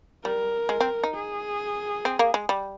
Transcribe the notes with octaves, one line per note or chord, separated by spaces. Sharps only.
G3 A#4
G#3
C4
D#4
G#4
C4
A#3
G#3
G3